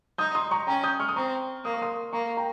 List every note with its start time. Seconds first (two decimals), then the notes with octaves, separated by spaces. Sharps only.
0.18 D#4 D#6 G6
0.35 C6 D#6
0.51 A#5 C#6
0.67 C#4 G5 A#5
0.84 D#6 G6
1.00 C#6 F6
1.09 D#6
1.16 C4 A#5 C#6
1.65 A#3 D#6
1.73 C#6
1.82 C6 D#6
2.13 A#3 A#5 C#6
2.37 G5 A#5